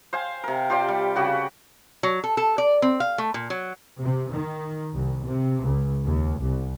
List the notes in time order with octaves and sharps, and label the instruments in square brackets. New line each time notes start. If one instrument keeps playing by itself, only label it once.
[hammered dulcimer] C5 F5 G#5
C3 A#4
F4 G4 C5 D5
G3
C#3 F#4 G4
[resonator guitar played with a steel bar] F#3
A4
A4
D5
C4
F5
A3
A#2
F#3
[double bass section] C3
D#3
C2
C3
C#2
D#2
C2